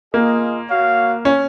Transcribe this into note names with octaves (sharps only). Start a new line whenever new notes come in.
A#3 F4 G#4 D#5
F#4 C#5 F5
C#4